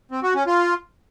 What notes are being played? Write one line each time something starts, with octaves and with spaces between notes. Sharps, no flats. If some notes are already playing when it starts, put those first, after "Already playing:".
C4
F#4
C#4
F4